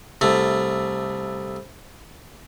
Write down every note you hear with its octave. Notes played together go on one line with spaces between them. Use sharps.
C2 A3